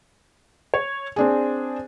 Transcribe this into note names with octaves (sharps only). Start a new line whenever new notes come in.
C#5
C4 D4 G#4